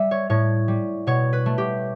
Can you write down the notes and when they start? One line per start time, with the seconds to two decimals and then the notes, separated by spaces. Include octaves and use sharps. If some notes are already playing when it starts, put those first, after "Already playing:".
Already playing: G3 E5
0.11 C#5
0.30 A2 C#5
0.68 G3
1.07 B2 C#5
1.33 B4
1.46 A3
1.58 G4